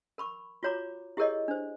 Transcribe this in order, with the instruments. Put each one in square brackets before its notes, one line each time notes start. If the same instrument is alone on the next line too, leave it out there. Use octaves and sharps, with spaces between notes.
[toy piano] A#4 B5 C#6
F4 F#4 C#5 A#5 D6
E4 G4 G#4 A#4 C#5 D#5
D4 C5